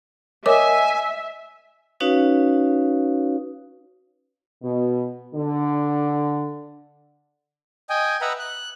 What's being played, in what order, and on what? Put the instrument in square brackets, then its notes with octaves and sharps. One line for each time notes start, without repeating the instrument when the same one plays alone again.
[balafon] A#4 C#5 D6 [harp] D#5 [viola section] E5 [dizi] G#5
[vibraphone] C#4 D#4 F#4 B4 C#5 F5
[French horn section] B2
D3
[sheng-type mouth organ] D#5 G5 G#5
B4 D#5 E5 F#5 A#5 B5
F#6